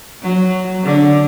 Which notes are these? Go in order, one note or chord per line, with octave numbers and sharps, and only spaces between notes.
F#3
D3